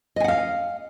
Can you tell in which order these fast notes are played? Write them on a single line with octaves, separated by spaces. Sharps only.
D#5 G#5 F#5 F5